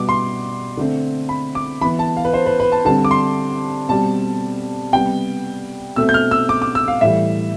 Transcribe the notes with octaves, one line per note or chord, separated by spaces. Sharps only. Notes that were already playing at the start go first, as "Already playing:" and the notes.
Already playing: B2 G3 B3 D6
C6
D3 A3 C4
B5
D6
E3 B3 B5
A5
F5
B4
C5
B4
B4
A5
D3 G3 C4 A5
D6
C6
B2 G3 C4 A5
C3 G3 B3 G5
B2 A3 C4 E6
G6
F6
E6
D6
D6
E6
F5
A2 E3 G3 E5